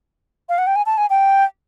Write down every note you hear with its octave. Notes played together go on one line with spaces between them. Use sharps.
F5
F#5
G5
G#5
A5
G#5
G5